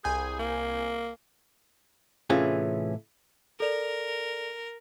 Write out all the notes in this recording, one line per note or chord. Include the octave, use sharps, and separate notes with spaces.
C2 G#4 G#5 G6
A#3
A2 C3 E3 C#4 F4 G#4
A4 A#4 D5 F7